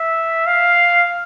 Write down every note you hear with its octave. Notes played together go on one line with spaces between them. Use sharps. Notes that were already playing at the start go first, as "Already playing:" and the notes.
Already playing: E5
F5